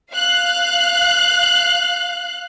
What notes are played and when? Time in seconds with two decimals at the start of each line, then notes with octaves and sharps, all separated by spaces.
0.13 F5 F#6